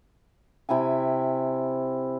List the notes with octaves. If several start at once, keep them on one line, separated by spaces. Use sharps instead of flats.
C3 E4 G5 G#5